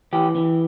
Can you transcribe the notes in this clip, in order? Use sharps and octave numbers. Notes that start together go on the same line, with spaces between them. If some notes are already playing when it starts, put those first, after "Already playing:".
E3 G4
E3